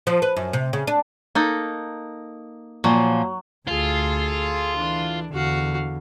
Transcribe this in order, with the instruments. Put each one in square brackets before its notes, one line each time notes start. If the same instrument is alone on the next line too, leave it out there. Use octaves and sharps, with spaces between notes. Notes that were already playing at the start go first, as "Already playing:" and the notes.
[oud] F3
B4
F#2
C3
C#3
D4
[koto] A#3 D#4 A4
[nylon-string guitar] A#2 F3 [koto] F#3
[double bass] D2 [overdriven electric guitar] F4 [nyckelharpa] G#4 A4
[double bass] E3 [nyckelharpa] D4
[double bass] E2 D3 [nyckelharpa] F#4 F5